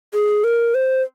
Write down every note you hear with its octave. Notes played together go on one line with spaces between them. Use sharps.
G#4
A#4
C5